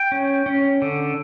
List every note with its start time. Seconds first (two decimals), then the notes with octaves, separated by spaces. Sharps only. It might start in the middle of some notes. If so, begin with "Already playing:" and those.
Already playing: G5
0.12 C#4
0.46 C#4
0.82 D3